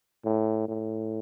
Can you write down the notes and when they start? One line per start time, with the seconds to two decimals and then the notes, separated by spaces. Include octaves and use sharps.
0.25 A2
0.68 A2